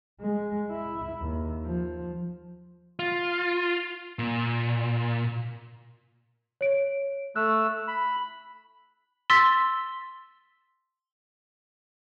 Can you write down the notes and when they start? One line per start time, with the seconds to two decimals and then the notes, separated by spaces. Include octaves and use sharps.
0.21 G#3
0.71 E4
1.19 D#2
1.64 F3
2.99 F4
4.19 A#2
6.61 C#5 D7
7.36 A3 E6 F#6
7.88 B5
9.30 C6 E6 A6 B6